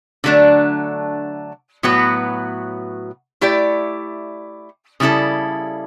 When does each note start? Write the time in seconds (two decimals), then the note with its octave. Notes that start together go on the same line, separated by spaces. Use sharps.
0.24 D3 F#3 A3 D4
1.83 A2 F#3 B3 F#4 B4
3.41 A3 E4 G4 D5
5.00 C#3 G3 C#4 E4 A4